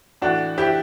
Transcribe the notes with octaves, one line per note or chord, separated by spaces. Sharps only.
A2 E3 D4 F#4
E4 G4